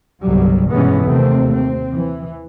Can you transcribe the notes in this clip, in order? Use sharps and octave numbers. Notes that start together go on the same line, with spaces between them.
G1 C2 F#3 G3
G2 B2 E3 G#3 B3 C#4
D#2 C3 A3 C4
C4
E3